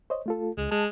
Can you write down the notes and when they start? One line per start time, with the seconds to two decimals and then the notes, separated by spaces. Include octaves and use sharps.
0.10 C5 C#5 D#5
0.26 A3 F4 A4
0.57 C#2 G#3
0.71 G#3 A5